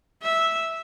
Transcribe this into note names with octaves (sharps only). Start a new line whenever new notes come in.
E5